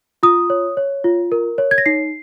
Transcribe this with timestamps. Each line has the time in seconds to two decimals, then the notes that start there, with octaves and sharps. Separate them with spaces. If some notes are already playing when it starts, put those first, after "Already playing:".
0.23 F4 D#6
0.50 C#5
0.77 C#5
1.04 F4
1.32 A#4
1.58 C#5
1.71 G#6
1.78 A#6
1.86 D#4 C7